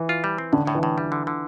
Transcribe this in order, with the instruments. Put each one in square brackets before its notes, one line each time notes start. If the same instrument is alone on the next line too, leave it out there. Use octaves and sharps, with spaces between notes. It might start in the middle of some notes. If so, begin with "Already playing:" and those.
Already playing: [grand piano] E3
[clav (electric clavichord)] F4
G3
C4
[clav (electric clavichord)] A2 [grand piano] D3
[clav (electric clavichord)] A2
[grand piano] E3
[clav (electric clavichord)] A2
G3
D3
D3